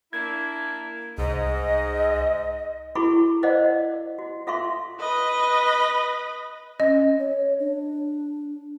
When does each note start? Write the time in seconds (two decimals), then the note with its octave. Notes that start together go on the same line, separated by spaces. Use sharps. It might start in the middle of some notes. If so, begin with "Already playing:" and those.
0.13 A#3 D4 E4 G#6
1.18 C2 G#2 D#5
2.95 E4 F#4 G#4 A4 B5 C#6
3.43 A#4 C5 D5 D#5 F5 F#5
4.19 F#4
4.47 F4 A4 E5 F5 C6 C#6
5.00 B4 D#5
6.80 C#4 D#5
7.19 C#5
7.60 D4